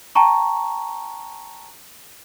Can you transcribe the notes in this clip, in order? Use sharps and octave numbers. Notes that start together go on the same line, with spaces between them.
G5 A5 A#5 C#6